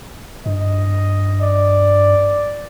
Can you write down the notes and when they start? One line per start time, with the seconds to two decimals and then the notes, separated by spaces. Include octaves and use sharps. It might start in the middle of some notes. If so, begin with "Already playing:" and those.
0.46 G2 D#5
1.41 D5